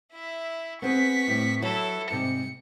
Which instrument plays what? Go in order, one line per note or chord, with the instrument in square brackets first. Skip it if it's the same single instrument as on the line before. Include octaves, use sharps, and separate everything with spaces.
[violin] E4 E5
[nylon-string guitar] B3 C4 G#4 [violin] C#6 B6
[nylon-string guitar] A2 G3 C4
[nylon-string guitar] F#3 [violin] E4 A4
[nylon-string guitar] G#2 C3 G3 [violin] C#7